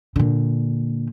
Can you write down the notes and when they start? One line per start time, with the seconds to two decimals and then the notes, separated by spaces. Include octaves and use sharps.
0.16 A#2 D3